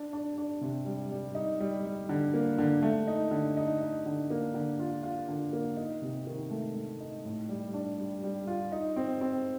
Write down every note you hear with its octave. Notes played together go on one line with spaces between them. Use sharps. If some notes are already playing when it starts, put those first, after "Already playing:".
Already playing: D4
D4
D4
C3
G3
G3
D#4
G3
G3
D3
A#3
D3
A3
D#4
D3
D#4
D#4
D3
A#3
D3
F4
F4
D3
A#3
D#4
C3
D#3
A3
A3
D#4
A2
G3
D4
G3
G3
F4
D#4
C4
C4